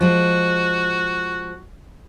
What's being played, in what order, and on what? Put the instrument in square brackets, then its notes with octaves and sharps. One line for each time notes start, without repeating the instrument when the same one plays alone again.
[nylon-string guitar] F3 G#3 [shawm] F#4